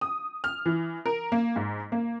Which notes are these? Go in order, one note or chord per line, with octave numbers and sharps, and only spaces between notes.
D#6
F6
E3
A#4
A#3
G#2
A#3